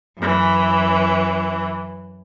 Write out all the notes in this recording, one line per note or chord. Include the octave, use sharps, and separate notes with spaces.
F#2 E3